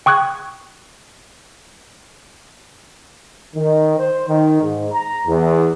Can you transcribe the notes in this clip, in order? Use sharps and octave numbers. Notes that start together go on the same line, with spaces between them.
G5 C#6 D#6 F#6 G#6
D#3
C5
D#3
G#2
A#5
E2